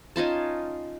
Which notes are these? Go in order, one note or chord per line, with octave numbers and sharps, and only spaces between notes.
C#4 D#4 F4 A5